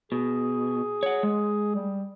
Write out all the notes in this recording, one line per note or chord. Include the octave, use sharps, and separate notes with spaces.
B2 G#4
C#5 F#5
G#3
G3